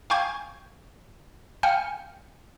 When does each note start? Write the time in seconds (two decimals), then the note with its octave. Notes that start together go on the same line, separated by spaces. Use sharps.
0.10 F5 G5 G#5 C#6 G6 G#6
1.63 F5 G5 G#5 F6 G6 C#7